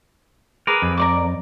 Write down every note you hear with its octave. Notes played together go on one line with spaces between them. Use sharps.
G#4 A#4 B4 D6
F2
A#4 D5 D6